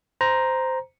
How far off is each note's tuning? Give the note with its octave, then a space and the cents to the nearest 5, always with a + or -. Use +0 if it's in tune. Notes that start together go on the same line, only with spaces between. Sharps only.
C5 -10 A#5 +10